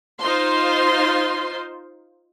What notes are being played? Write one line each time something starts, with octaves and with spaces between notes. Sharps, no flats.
D#4 F4 C5 C6